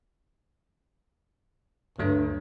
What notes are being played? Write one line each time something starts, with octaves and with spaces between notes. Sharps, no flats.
D2 G2 F#3 A3